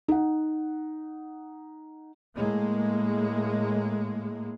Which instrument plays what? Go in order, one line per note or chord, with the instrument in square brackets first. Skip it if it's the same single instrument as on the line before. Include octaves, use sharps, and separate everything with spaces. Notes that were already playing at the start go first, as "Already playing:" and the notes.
[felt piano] D#4 F#5
[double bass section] A2 G#3 A#3